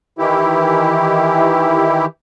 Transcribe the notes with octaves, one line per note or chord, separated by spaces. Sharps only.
D#3 E3 E4 G4